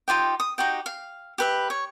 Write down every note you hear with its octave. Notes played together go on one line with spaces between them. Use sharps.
D#4 F4 G4 G5
D#6
D#4 F#4 G4 G5
F5
G4 B4 E5
C#5